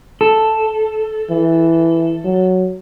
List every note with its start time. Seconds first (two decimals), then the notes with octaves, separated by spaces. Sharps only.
0.21 A4
1.30 E3
2.24 F#3